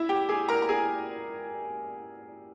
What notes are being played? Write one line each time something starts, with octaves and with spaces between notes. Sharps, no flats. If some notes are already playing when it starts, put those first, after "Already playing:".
Already playing: E4 E5
G4 G5
G#4 G#5
A#4 A#5
A#5
G#4 G#5